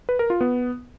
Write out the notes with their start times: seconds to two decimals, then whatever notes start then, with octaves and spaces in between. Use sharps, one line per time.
0.09 B4
0.19 A#4
0.30 F4
0.41 B3